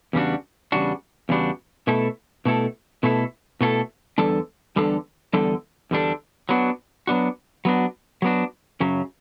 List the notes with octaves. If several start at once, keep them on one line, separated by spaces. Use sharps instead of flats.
E2 C#3 G3 D4 F#4
E2 C#3 G3 D4 F#4
E2 C#3 G3 D4 F#4
B2 A3 E4 A4
B2 A3 E4 A4
B2 A3 E4 A4
B2 A3 E4 A4
E2 D3 G3 D4 A4
E2 D3 G3 D4 A4
E2 D3 G3 D4 A4
E2 D3 G3 D4 A4
F#3 B3 D4 F#4
F#3 B3 D4 F#4
F#3 B3 D4 F#4
F#3 B3 D4 F#4
F#2 C#3 F#3